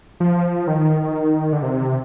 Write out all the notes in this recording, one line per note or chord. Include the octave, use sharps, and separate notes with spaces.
F3
D#3
D3
C3